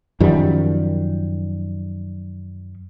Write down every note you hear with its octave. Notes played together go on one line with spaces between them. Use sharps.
F#2 D#3 F3 G3